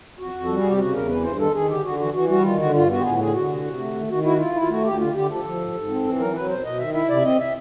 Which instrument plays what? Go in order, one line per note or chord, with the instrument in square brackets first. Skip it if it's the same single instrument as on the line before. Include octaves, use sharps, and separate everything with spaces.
[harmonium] F2 F#4
F2
G3 A4
G#4
C3 G4
C#3 F#4
E2 A#4
E3 B4
G2 C5
D#3 A4
D#3 G#4
D3 G4
D3 F#4
E3 F#4
E3 F#4
G3 F#4
D#3 F4
D3 F#4
G2 F4
B3 F#4
G4
A2 G#4
D3 G#4
D3 F#4
C3
C3
A3
D#3
D#3 F#4
E4 F#4
E4 F4
E4
F4
A3 F#4
D2 G4
D3 F4
D3 G4
F3 A4
F3
G#2
G#2
C4
E3
F#3 A#4
F#3 B4
B2 C5
B2 D#5
D#3 E5
E4 E5
C3 D5
E5
C4 D#5
E5